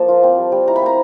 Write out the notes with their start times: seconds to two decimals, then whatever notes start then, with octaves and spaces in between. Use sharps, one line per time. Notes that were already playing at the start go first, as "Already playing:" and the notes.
Already playing: F3 A#3 A5
0.08 F4
0.23 C4
0.38 G3
0.52 G3
0.68 E4 A#5
0.76 B5
0.81 C4 A#5